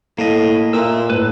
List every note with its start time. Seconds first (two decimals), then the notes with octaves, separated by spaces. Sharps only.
0.18 A2 A#3 D#5
0.73 A#2 A#4 E5 E6
1.10 A2 B4